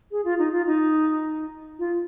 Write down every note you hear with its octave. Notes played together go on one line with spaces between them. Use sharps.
G#4
F4
D#4
F4
D#4
F4